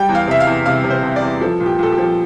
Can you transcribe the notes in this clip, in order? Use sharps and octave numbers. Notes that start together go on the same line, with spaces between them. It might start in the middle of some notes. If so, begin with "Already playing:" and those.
Already playing: G3 G5
E2
F5
C3 E5
F5
E2
C3 F5
C3
C5
C3
D5
E2
F3 A4
A#2
G4
A#2 A4
G4
F3